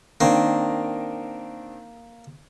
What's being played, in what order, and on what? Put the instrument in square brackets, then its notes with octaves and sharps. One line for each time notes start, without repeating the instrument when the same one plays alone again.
[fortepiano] D#3 C4 D4 [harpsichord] A#3